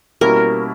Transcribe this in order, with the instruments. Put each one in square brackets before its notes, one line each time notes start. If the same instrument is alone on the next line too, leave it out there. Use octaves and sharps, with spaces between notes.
[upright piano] B2 G3 A#3 C#4 E4 [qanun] A#4